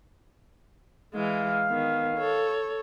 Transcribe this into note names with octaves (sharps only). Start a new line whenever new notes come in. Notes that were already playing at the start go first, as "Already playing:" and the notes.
E3 G#3 F5
D#3 B3
A4 C#5